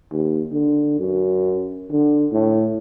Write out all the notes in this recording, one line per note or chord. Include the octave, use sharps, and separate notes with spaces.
D#2
D3
F#2
D3
A2